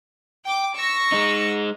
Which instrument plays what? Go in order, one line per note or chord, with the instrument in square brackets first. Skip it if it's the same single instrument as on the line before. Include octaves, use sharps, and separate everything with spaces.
[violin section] G5 D6
C#6 E6 A#6
[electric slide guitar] G#3 D#4